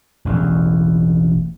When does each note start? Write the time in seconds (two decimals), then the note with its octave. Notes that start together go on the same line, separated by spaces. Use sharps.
0.25 E1 A1 E2